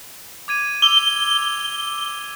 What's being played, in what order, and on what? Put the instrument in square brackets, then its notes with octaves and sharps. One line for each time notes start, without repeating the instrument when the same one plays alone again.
[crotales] D6 G#6 D#7
[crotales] D6 E6 [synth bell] G7